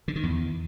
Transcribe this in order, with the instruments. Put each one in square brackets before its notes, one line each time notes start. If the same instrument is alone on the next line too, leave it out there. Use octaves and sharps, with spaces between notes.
[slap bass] D3
D#3
E2